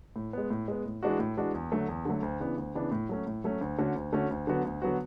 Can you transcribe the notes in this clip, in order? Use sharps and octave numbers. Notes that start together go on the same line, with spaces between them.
A2
G#3 B3
A2
G#3 B3
A2
E3 G#3 D4 F#4
A2
E3 G#3 D4 F#4
E2
D3 F#3 A3
E2
D3 F#3 A3
D2
C#3 E3 B3 D4
D2
C#3 E3 B3 D4
A2
F#3 A3 C#4
A2
F#3 A3 C#4
D2
D3 A3 C#4 F#4
D2
D3 A3 C#4 F#4
D2
D3 F#3 B3 F#4
D2
D3 F#3 B3 F#4